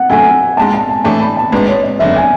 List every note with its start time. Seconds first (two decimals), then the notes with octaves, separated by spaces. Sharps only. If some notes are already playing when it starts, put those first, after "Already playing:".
Already playing: F#5
0.10 F#2 D3 A3 G#5
0.57 G#2 G#3 D4 A5
0.74 A5
0.89 G#5
1.04 A2 E3 A3 D4 A5
1.21 B5
1.37 A5
1.52 G#1 G#2 G#3 D4 B4
1.68 C#5
1.83 D5
1.99 F#1 E2 D3 E5
2.16 G#5